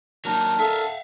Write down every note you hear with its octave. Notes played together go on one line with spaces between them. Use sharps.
F#3 A#3 D4 D#4 A#4
A4 E5 F5